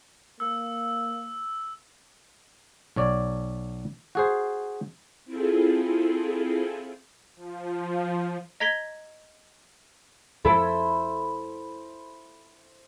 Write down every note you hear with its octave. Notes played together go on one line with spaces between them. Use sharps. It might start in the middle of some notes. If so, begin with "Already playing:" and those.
A#3 E6
B1 C#5 D5
F#4 G#4 C5
C4 E4 F4 G#4 A4
F3
D#5 A#5 G#6 B6 G7
F2 E4 A4 C5 B5